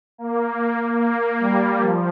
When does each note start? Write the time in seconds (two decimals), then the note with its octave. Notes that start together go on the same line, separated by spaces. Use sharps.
0.18 A#3
0.99 A#3
1.40 G3
1.80 F3